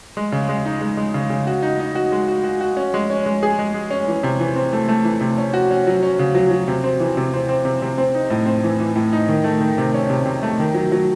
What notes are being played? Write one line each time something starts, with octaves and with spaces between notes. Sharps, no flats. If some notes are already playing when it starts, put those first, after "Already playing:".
G#3
C#3
G#3
D#4
G#3
G#3
C#3
C#3
F#4
D#4
D#4
F#4
G#3
F#4
F#4
F#4
C#4
G#3
C#4
G#3
G#4
G#3
G#3
C#4
E3
C3
E3
C4
A3
A3
E3
C3
C#4
F#4
C#4
F#3
C#4
C#3
F#3
F#3
C3
C4
E3
C3
C4
C4
C3
C3
C4
D#4
A2
C4
E3
E3
A2
D#4
D#3
A3
D#3
C3
C#4
C3
C3
A3
D#3
F#3
F#3